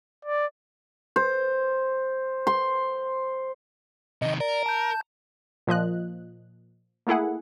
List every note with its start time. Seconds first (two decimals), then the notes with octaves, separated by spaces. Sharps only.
0.25 D5
1.16 C5
2.47 C6
4.22 C3 D#3 D#5
4.40 A#4 D5
4.66 A5 G6
5.67 A#2 F3 D#5 F#6
7.07 A3 A#3 E4 G#4 F#5